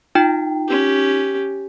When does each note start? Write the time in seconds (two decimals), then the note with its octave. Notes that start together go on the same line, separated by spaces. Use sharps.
0.15 D#4 F4 G5
0.68 C#4 G4